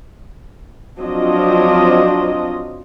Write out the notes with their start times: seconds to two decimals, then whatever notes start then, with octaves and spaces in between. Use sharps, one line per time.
1.00 F3 F#3 C4 D4 F4 D#5